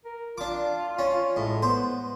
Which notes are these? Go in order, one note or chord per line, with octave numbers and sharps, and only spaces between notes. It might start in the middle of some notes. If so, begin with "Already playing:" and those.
A#4
D4 F4 D6
C#4
A2 G#3
B3 C5